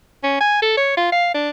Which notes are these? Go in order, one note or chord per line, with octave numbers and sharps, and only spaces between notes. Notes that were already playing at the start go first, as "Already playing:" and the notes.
C#4
G#5
A4
C#5
F4
F5
D4